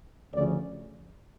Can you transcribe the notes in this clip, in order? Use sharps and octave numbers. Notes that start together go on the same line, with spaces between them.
D2 C#3 F3 D5